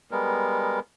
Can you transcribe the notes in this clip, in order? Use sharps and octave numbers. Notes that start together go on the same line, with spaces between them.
G3 G#3 B3 A#4